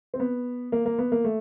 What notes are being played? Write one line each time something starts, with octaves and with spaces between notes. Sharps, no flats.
C4
B3
A#3
A#3
B3
A#3
A3